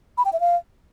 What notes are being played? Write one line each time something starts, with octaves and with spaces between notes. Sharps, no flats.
B5
G5
E5
F5